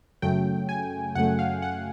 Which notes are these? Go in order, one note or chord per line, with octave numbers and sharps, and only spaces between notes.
F#2 C#3 F#3 A3 G5
G#5
F#2 C#3 F#3 A3 F#5
F5
F#5